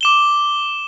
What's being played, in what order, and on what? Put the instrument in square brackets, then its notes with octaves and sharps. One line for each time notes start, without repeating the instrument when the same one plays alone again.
[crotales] D6 E7 G7